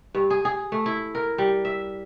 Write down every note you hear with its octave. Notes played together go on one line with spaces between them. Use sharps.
G2
G#4
G#4
A3
E4
A#4
G3
E5